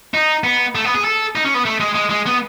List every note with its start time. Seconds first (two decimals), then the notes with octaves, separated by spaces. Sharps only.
0.14 D#4
0.44 B3
0.75 A3
0.85 B3
0.95 G#4
1.04 A4
1.36 D#4
1.45 C#4
1.55 B3
1.66 A3
1.80 G#3
1.95 G#3
2.10 G#3
2.26 B3